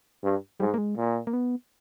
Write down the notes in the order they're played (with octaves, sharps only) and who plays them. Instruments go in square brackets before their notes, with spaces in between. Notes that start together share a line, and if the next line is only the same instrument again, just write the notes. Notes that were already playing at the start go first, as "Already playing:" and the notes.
[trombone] G2
[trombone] G#2 [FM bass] G3
[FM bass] A#3
G#3
[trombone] A#2
[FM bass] A#3
B3